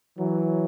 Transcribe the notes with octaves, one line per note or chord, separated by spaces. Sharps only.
E3 F#3